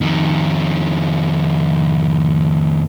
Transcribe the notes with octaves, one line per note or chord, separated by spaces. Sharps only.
F2 D#3